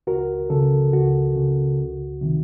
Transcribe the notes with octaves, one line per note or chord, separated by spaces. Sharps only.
C#2 F#4 A#4
C#3 A4
C#2 F#4
C#3
C#2
C3 D#3